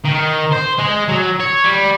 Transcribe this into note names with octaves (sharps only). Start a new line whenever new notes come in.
D#3
C5
G#3
F#3
C#5
G3